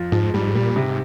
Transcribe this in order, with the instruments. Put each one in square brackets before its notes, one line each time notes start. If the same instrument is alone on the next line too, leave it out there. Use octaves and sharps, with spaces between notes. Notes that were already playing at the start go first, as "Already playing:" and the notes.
Already playing: [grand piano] F2 F4
[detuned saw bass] G#2 [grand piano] F3
[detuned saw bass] G#2 [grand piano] G3
[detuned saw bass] A#2 [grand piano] G3
[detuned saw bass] G#2 [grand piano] C3